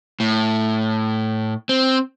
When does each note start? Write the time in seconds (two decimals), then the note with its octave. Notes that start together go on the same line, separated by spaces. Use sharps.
0.20 A2
1.69 C4